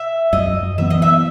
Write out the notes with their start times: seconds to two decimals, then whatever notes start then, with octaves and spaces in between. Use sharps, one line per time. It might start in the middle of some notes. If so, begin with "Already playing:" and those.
Already playing: E5
0.33 F#2 D#5
0.78 E3 B3 E5
0.90 D#5
1.02 E5